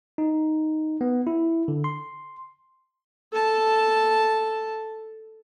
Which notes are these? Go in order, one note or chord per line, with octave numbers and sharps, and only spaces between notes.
D#4
B3
E4
D3
C6
A4 A5